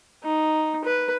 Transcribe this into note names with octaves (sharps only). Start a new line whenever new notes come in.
D#4
B4